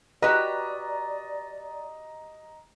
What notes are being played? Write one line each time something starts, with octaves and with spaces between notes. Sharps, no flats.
F#4 G4 B4 D5 D#5 A#5